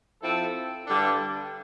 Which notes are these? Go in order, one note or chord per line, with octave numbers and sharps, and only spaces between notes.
F3 C4 E4 A4
G2 D3 G3 D4 A4